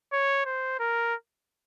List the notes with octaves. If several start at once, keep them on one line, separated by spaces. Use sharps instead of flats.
C#5
C5
A#4